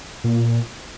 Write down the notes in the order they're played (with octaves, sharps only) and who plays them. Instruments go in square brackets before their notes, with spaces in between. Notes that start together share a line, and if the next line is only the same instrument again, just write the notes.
[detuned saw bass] A#2